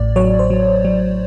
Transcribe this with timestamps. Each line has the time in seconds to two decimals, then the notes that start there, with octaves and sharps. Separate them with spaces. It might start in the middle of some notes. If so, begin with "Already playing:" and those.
Already playing: A1 A2 D5
0.16 F#3 C#5
0.39 C5
0.50 F#3
0.85 F#3